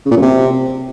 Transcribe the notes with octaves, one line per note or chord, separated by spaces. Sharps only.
C#3
A#2
F#2
C3